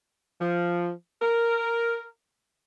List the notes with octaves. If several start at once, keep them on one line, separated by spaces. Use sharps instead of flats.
F3
A#4